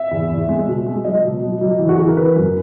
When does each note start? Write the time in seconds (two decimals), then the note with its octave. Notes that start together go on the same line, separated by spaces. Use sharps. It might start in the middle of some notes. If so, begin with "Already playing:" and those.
Already playing: E5
0.11 E2
0.30 E2
0.49 G#3
0.67 B2
0.86 G#3
1.05 F#3 D#5
1.24 B2
1.42 F#3
1.61 F#3
1.79 E3
1.89 F#4
1.99 E3 G#4
2.08 A#4
2.17 E3 B4
2.36 F#2